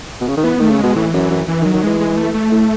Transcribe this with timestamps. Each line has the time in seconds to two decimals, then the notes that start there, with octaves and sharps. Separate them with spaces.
0.21 B2
0.28 C#3
0.37 D#3
0.43 E3 B3
0.59 D#3 A3
0.70 C#3
0.78 B2 G#3
0.95 A2 E3
1.14 F#2
1.30 F#2
1.48 E3
1.61 D#3
1.65 F#3
1.73 D#3
1.83 E3 G#3
2.00 G#3
2.16 A3
2.34 A3
2.52 A2